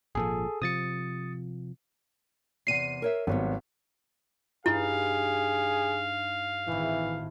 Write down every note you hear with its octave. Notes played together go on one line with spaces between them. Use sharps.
G#1 A#2 F3 G#4 A4
C3 F3 D#6 A6 C#7
E2 C3 F#5 C7 D#7
A#4 C#5 E5
G#1 F#3 G3 B3
G2 D#4 E4 G#4 F5
G#1 A2 E3